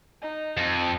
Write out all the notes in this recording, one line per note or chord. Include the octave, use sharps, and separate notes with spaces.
D#4
F2